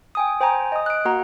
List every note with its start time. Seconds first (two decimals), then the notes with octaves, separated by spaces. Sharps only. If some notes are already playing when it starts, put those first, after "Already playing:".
0.15 G5 G#5 D#6
0.41 C5 G5 G#5 A#5
0.72 D#5 D#6
0.86 F#6 D7
1.05 A#3 F#4 F#5 A#5